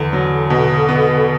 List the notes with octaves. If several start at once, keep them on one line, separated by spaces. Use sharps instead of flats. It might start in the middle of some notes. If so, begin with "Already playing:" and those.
Already playing: E2 D3
F#3
B2
B3